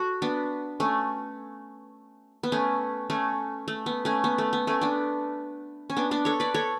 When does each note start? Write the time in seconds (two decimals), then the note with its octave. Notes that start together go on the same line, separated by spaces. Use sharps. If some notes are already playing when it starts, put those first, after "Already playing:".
Already playing: F#4 A4
0.22 B3 D4
0.80 A3 C#4
2.43 B3
2.52 A3 C#4
3.10 A3 C#4
3.68 A3
3.86 B3
4.05 A3 C#4
4.24 B3
4.38 A3
4.53 B3
4.67 A3 C#4
4.81 B3 D4
5.90 C#4
5.97 B3 D4
6.11 B3 D4
6.25 A4 C#5
6.40 B4 D5
6.54 A4 C#5